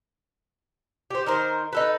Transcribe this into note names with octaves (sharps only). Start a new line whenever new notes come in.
G4 C5
D#3 A#4 C5
D#4 A4 B4